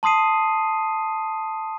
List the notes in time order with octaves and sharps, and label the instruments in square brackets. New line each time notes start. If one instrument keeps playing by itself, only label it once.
[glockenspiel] A5 C6 D#6 C7 D#7